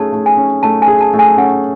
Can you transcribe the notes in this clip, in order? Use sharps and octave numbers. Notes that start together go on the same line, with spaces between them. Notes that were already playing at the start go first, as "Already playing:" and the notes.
Already playing: A3 C#4 G#4 A5
A3
G#5
C#4
A3 A5
G#5
G#4
A5
A3
G#5
C#4 F#5